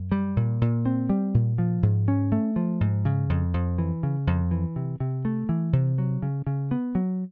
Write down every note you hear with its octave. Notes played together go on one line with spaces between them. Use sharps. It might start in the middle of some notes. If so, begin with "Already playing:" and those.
Already playing: F#2
G3
A#2
A#2
C4
G3
A#2
F3
G#2
C#4
A3
F3
G#2
C#3
F2
F2
E3
C#3
F2
E3
C3
C3
A3
E3
C3
F#3
C#3
C#3
B3
F#3